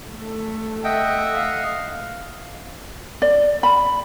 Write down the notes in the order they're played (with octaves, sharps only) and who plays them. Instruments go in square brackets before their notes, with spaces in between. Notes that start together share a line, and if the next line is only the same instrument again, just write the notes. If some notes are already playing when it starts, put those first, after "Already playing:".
[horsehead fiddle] A3 A4
[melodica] D#5 F#5 [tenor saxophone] E5 [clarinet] G5
[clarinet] F5
[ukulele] D5
B5